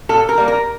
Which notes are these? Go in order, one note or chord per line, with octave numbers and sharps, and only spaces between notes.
A#2 A4
A#4
G3 A#3
A#4